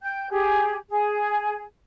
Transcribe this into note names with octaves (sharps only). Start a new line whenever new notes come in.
G5 G6
G4 G#4
G#4